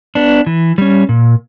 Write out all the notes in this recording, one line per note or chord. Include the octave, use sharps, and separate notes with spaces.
B3 D4
E3
G3 C#4
A#2